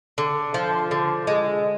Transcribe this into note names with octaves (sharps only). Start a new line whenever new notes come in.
D3
F3
D3
G#3